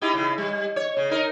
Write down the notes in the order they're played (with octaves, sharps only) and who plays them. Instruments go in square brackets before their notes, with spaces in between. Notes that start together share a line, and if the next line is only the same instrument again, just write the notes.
[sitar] D#4 E4 G4
C#3 E4
G3
C#5
C#3
D#4 A#4